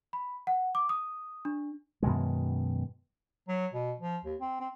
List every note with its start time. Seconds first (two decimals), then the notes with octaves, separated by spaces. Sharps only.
0.13 B5
0.47 F#5
0.75 D6
0.89 D#6
1.45 D4
2.03 F#2 B2 D#3 G#3
3.48 F#3
3.74 B2
4.00 F3
4.25 D#2
4.41 C4
4.60 C4